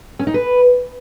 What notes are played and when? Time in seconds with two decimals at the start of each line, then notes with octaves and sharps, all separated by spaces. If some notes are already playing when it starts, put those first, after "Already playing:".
0.19 C#4
0.27 D#4
0.34 B4